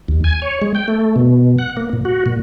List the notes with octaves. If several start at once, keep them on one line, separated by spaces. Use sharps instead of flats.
D#2
G#5
C#5
G#3
G5
A3
B2
F#5
A#3
A#2
F#4
A#2